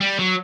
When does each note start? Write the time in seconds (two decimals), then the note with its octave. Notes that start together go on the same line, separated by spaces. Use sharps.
0.01 G3
0.19 F#3